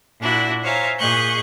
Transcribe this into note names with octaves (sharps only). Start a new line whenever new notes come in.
A#2 D4 E4 F#4
C5 C#5 E5 F5 G#5 A#5
A#2 G#4 D#5 C#6 F#6 G6